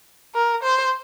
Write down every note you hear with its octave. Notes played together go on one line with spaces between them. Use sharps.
A#4
C5